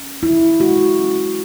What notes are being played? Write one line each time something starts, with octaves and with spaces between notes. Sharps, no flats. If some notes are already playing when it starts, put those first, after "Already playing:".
Already playing: C#4
E3 E4
G#3 F#4
C#4